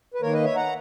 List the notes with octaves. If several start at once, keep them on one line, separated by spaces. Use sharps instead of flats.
B4
D#3 A#3 A#4 C#5
B4 D#5
C#5 E5
F#5 A#5